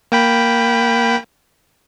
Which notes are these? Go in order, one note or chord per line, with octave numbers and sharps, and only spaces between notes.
A#3 G5 B5